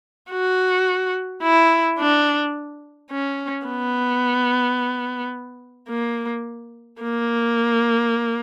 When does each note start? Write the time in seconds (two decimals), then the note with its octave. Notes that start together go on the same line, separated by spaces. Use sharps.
0.31 F#4
1.42 E4
1.98 D4
3.11 C#4
3.66 B3
5.89 A#3
7.01 A#3